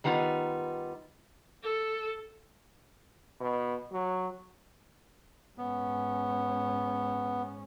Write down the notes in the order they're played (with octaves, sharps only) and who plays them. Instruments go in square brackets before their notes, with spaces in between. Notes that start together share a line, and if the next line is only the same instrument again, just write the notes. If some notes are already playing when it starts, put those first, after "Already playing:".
[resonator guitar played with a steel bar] D#3 G3 B3 D#4 F4
[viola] A4
[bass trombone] B2
F#3
[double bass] G#2 C#4 [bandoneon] B3